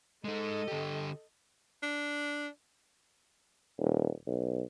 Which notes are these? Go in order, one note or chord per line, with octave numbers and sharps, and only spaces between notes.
G#3 D#4 A4 D#5
D3 G4
D4
D#1
B1